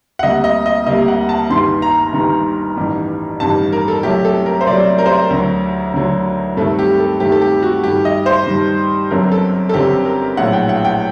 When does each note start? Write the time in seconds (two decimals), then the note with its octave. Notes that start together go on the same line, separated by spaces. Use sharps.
0.19 F#5
0.23 D2 C3 G3 A#3 D#5
0.44 D#5
0.66 D#5
0.86 D2 C3 G3 A#3 D#5
1.08 F#5
1.29 A5
1.49 G1 G2 D#3 G3 C6
1.82 A#5
2.13 G1 G2 D#3 G3
2.77 A1 G2 D#3 G3
3.40 A1 G2 D#3 G3 A5
3.72 A#4
3.88 A4
4.03 C2 C3 F#3 A3 G4
4.25 A4
4.46 A#4
4.61 C5
4.67 C2 C3 F#3 A3 D5
4.98 A#4
5.06 C5
5.14 A#4
5.30 D2 D3 F#3
5.93 D2 D3 F#3
6.57 G2 D#3 A3 C4 A4
6.79 G4
7.00 A4
7.20 G2 D#3 A3 C4 G4
7.32 A4
7.42 G4
7.62 F#4
7.84 G2 D#3 G3 G4
8.05 D#5
8.26 C5
8.47 G2 D#3 G3
9.10 G1 F#2 D3 F#3 C4 A#4
9.32 A4
9.69 A4
9.74 G1 F#2 D3 F#3 C4 G4
10.05 A#4
10.37 A#1 A2 F#3 F#5
10.53 G5
10.69 F#5
10.85 G5